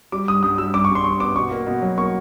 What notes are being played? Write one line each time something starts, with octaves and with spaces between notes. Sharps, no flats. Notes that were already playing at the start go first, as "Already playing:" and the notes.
G3 D6
G2 D#6
G2 D#6
G3 E6
G2 D6
C#6
G2
C6
G2 C#6
B3 D6
B2 C#6
A#3
B2
F#3
A#3 C#6